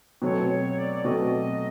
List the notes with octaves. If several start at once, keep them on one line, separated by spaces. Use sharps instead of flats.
B2 F#3 A3 C4 C#5
C#5
D5
D5
B2 F#3 A3 C4 D#5